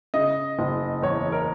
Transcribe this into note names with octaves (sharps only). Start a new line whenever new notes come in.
C#3 D#5
F#1
E2 C#5
A#4